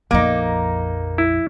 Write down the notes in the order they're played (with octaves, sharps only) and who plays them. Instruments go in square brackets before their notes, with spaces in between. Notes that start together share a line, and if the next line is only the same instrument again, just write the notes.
[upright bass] A#1 F2 [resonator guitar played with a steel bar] A#3 D#4
[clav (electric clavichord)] E4